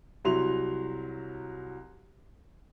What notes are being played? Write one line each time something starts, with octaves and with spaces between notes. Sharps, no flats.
C2 F#3 E4 C6 F7